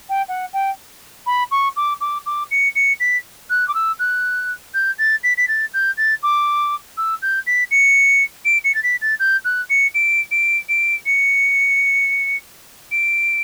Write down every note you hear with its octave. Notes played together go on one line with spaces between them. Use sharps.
G5
F#5
G5
B5
C#6
D6
D6
D6
C#7
C#7
B6
F#6
D6
E6
F#6
G6
A6
B6
B6
A6
G6
A6
D6
E6
G6
B6
C#7
D7
C#7
A6
B6
A6
G6
F#6
C#7
D7
D7
D7
C#7
D7